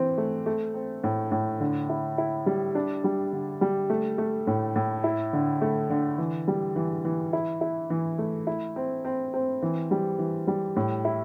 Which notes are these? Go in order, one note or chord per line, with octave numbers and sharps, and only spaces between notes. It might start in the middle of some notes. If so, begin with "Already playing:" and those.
Already playing: E3 C4
A3
A3
C4
A2
A2
D3
E4
E4
G3
D4
G3
D3
G3
A3
A3
A2
A2
E4
D3
A3
D3
E3
G3
E3
E3
E4
E4
E3
A3
E4
C4
C4
C4
E3
G3
E3
G3
A2
E4